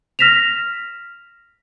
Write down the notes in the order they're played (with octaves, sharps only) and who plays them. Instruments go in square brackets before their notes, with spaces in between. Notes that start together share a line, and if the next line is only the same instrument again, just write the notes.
[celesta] F6 A#6 B6 E7 F7